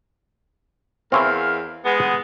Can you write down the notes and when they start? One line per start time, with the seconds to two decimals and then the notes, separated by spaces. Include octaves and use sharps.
1.12 E2 C4 C#4 E4 A#4 F5
1.84 G#3 B3